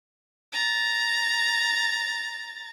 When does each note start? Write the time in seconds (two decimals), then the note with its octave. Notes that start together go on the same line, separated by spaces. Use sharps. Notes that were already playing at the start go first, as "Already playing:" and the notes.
0.52 A#5 A6